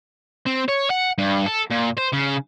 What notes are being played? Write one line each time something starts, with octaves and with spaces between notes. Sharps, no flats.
C4
C#5
F#5
G2
A4
A#2
C5
C#3